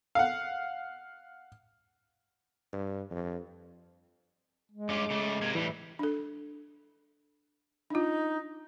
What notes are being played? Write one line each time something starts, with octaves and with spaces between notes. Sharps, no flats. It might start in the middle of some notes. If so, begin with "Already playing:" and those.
F5 F#5
G2
F2
G#3
G2 C#4 F4 D6
C#3 A3
C3 A#3 G#6
A2 E3 G3
D4 A4
D4 D#4 F4